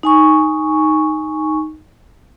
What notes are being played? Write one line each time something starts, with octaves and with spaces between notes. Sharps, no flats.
D#4 G#5 C#6